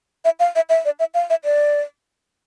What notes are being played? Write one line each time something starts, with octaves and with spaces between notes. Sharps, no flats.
E5
F5
E5
E5
D5
E5
F5
E5
D5